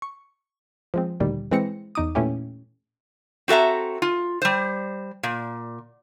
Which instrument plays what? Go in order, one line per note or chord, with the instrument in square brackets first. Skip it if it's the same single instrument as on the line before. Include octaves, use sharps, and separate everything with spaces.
[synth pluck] C#6
F3 G#3 C4
D2 A#2 D#3 G3
E3 G#3 C4 A#6 C#7
E2 D#4 D6 D#6
A#2 E3 A3 C#4 E4 G4
[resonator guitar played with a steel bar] C4 F#4 A4 E5 A#5
F4
G3 C5
A#2